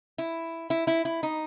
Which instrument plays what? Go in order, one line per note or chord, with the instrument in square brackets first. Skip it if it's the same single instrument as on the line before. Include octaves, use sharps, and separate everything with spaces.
[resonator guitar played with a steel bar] E4
E4
E4
E4
D#4